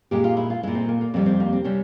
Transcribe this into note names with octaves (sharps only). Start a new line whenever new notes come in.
A#2 G#3 G4
F4
E4
F4
A#2 G#3 E4
C4
A#3
A#3
F2 C3 G3 C4
C4
A#3
C4
C3 G3 C#4